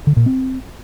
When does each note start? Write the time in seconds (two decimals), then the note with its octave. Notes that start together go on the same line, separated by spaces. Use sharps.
0.07 D3
0.17 A#2
0.26 C4